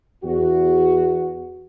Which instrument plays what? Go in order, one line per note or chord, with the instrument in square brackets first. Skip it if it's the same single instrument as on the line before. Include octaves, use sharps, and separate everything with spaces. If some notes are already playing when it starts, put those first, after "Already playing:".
[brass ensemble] E2 F#4